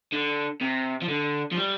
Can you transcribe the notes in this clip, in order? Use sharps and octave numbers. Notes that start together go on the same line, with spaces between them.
D3
C3
F3
D3
F3
G3